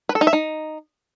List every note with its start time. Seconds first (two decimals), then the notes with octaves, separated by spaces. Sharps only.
0.09 B4
0.15 A4
0.21 D#4
0.27 E5
0.33 D#4